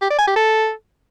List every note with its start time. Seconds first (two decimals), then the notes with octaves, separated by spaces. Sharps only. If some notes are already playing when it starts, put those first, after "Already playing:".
0.02 G4
0.10 D5
0.19 G#5
0.27 G4
0.36 A4